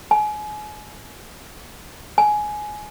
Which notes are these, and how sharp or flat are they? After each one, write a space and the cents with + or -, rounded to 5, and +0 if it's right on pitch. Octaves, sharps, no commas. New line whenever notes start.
G#5 +30
G#5 +15